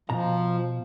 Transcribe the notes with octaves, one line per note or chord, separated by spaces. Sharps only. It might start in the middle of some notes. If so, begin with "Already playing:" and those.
B2 F3 A#5